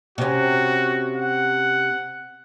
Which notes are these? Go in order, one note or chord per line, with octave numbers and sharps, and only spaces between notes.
C3 C#4 F#4
F#5